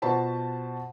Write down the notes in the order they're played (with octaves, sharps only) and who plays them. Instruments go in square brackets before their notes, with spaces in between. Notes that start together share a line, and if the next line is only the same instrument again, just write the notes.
[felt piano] B2 F4 F#4 C5 A5 B5